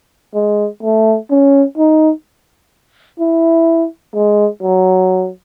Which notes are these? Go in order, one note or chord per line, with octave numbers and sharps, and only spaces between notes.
G#3
A3
C#4
D#4
E4
G#3
F#3